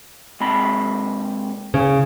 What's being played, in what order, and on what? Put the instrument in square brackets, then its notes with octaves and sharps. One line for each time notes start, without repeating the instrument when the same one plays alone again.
[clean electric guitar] G#2 C3 B5
[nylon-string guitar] C#3